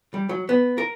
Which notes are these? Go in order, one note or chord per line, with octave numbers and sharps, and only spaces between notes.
G3
F#3
B3
A#4